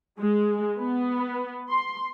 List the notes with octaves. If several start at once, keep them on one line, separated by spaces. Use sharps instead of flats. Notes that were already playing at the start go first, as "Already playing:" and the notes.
G#3
B3
C6